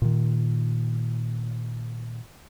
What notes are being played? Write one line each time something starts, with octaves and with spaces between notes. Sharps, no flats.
A#2 D#3